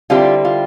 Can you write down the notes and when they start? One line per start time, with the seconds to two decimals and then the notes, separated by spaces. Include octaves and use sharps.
0.10 D3 G3 C4 E4 F4 G4
0.45 F4